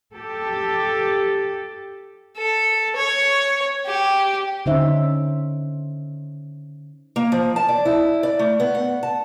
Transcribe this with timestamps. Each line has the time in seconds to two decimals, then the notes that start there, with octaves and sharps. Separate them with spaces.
0.14 G4 A4
2.37 A4
2.96 C#5
3.87 G4
4.66 D3 C#4 D#4 C5 C#5 E5
7.16 A#3
7.32 F3
7.56 A5
7.68 D5
7.85 E4
8.23 D5
8.39 A3
8.60 B3
8.75 F#5
9.03 A5